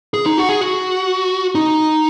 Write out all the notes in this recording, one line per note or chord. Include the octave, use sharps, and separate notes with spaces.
G#4
D#4
F#4
G#4
F#4
D#4